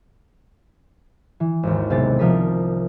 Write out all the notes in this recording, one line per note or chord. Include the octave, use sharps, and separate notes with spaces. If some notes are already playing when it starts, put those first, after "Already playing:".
E3
G#1 D#2
B1 C3 G#3 A6
C2 F3 A#4 D#6 B6